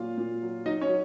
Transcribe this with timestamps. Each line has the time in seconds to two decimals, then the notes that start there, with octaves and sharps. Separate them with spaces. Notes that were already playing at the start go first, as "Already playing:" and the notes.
Already playing: A#2 F#3 F4 F5
0.17 A#2
0.42 F#3
0.66 F#3 D#4 D#5
0.81 C#4 C#5
0.89 F#3